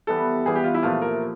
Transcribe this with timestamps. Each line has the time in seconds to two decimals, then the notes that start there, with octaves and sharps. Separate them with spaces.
0.07 E3 G3 B3 A4
0.46 E3 G3 B3 G#4
0.56 G4
0.64 F4
0.74 E4
0.83 A#2 F3 A3 F4
1.02 A#4